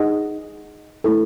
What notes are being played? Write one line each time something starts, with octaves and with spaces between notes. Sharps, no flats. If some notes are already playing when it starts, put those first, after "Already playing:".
Already playing: D#4 G#4 D#5 F#5
A3 E4 A4